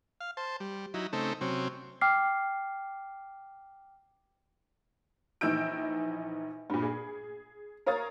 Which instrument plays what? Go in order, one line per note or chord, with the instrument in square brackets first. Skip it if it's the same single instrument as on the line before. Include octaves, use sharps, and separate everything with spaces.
[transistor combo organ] F5
C5 A5
G3
F#3 D#4 E4
C#3 A3 C4 D#4 A4
C3 F#3 C4 C#4
[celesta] G5 D6 F6 C7
[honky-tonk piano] A#1 E3 D#4 E6 G6 D7
G2 A#2
G#4
A#4 C#5 F5 A#5 D#6 A6